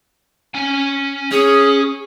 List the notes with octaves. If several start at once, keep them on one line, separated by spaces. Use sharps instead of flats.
C#4 G#5
C#4 G#4